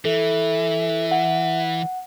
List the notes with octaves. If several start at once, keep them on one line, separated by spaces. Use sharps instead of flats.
E3 A4 E5
F#5